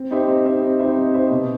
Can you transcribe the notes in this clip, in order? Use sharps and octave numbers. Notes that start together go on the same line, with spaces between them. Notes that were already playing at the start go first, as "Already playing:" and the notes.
Already playing: C4
D#4 G4 C5 E5
C4
D#4 G4 C5 E5
C4
D#4 G4 C5 E5
C4
D#4 G4 C5 E5
B2